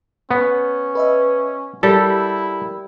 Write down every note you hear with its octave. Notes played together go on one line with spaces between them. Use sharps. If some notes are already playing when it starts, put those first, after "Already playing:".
B3 C#4
B4 D#5 E5
G3 E4 G4 A4 A#4